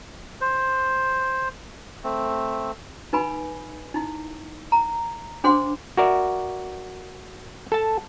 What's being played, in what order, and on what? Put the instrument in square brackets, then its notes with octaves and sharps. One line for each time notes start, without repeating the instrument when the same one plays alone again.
[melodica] C5
A3 C4
[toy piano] D#4 B4 G#5 B5
D#4 E4
A#5
D4 G#4 C5 F#5 C6 D6
[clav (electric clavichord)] F#4 A#4 D5 E5
A4 A5